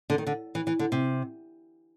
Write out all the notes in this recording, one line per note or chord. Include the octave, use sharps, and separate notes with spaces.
D3
D#3
D3
E3
E3
D3
C3